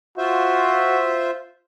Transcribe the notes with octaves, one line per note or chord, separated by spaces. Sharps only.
F4 F#4 C5 E5